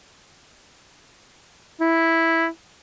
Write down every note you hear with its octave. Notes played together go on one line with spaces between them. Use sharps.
E4